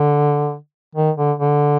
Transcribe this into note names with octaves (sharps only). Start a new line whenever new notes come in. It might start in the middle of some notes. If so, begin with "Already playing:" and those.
Already playing: D3
D#3
D3
D3